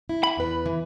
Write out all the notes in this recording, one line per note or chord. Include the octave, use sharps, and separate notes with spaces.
E4
B5
E2 B4
E3